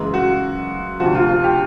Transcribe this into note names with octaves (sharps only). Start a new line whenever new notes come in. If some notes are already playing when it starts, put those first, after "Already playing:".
Already playing: F#2 C#3 E3 G#3
F#4
D2 C3 F3 F#4
F4
F4
G4